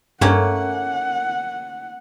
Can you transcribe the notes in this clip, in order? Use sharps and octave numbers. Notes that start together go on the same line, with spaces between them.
G2 A3 A#3 C#4 F#5